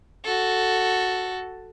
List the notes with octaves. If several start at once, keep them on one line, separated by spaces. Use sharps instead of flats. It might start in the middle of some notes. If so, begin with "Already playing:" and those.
F#4 A4